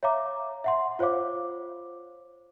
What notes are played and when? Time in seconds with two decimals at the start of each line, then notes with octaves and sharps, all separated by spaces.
0.03 C#5 E5 F5 A#5 D6
0.64 E5 F#5 C6
0.99 F4 C5 C#5 F5 D6